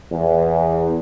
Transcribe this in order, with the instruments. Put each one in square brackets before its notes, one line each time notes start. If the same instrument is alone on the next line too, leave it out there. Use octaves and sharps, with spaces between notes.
[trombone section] E2